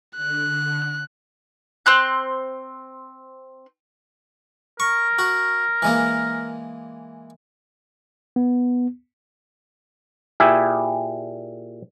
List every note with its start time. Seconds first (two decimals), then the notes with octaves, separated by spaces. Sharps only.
0.17 D3 F#6
1.86 C4 C6 F#6 G6
4.80 A#4 C#6
5.19 F#4
5.82 E3 G#3 A#3
8.36 B3
10.40 A#2 E4 G4 G#4 E5